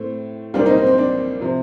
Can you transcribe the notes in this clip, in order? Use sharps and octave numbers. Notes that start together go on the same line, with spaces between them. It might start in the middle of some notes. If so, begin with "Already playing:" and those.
Already playing: A2 A3 C4
C2 A#2 G3 A#3 D4 F4
C4 D#4
C4
C4
D4
C3 F3